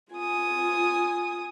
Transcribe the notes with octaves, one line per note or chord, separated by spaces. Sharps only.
F4 G#5 D#6